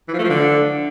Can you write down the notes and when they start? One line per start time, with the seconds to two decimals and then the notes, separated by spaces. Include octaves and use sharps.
0.08 E3
0.14 F3
0.19 A3
0.24 F3
0.29 D3